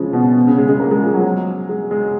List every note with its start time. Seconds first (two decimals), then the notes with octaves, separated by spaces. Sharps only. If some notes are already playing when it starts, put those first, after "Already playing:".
Already playing: C#3 F3 G#3
0.13 B2
0.47 C#3
0.58 G#3
0.69 G#3
0.80 A#3
0.91 G#3
1.03 F3
1.14 F#3
1.69 G#3
1.91 G#3